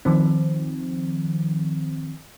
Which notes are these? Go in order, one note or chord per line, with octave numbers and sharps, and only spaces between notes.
D#3 F3 C4